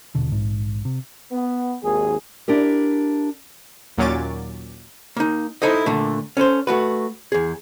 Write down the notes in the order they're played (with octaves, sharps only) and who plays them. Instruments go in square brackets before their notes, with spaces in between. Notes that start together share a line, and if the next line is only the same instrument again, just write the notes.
[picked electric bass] D#1 B2 D3
A#1 G#2
C3
[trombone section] B3
G#1 D#2 G#4
[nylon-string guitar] D4 E4 G4 A#4
[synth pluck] D#2 A#2 F#3 C#4 D6 A6
[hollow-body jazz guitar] A#3 D#4
D#4 E4 A4 C5 D#5
A#2 D3 A3
C#4 A4 B4 C5
A3 F#4 B4
E2 G#4